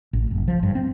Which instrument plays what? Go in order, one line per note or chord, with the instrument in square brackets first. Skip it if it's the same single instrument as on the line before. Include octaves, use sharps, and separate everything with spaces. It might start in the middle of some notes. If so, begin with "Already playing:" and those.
[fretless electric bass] A1
F#1
F3
G2
C4